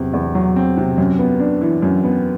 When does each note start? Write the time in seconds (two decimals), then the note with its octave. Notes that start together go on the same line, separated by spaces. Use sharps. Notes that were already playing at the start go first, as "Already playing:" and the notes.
Already playing: E2 C3 F#3 C4
0.13 E2
0.35 F#3
0.56 C4
0.77 C3
0.98 F#2
1.19 B3
1.40 D4
1.61 E3
1.82 F#2
2.04 B3